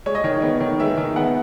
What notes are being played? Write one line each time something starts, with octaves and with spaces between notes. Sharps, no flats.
G#3 C#5
D#5
D#3 C#5
B3 C#5
D#3
G#3 E5
D#3
B3 F#5